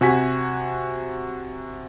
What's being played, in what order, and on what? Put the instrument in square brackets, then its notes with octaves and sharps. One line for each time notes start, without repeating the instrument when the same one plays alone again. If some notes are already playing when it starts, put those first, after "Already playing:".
[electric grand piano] C3 F#4 G#5 B6